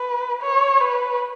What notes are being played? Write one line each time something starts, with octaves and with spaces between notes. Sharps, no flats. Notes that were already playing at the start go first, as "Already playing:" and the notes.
Already playing: B4
C#5
B4